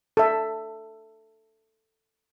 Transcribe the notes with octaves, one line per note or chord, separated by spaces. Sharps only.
A4 E5